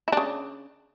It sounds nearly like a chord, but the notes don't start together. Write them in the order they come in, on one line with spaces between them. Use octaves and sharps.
E4 D4 C#3